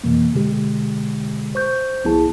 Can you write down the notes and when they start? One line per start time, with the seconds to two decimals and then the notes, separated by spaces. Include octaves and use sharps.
0.04 F2 B2 E3 A#3
0.34 B2 D3 G#3 G4
1.55 C5 C#6 G6
2.04 C2 F3 B3 E4 G#4 A5